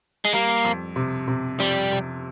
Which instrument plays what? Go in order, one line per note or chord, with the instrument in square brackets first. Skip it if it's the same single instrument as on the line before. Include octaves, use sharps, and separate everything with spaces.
[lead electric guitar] G#3
[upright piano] G3 [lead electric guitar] A#3
[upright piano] F2
C3
C3
[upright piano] F2 [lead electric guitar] G3
[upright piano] C3